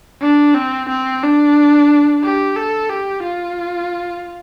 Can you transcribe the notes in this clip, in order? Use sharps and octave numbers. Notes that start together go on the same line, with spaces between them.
D4
C4
C4
D4
G4
A4
G4
F4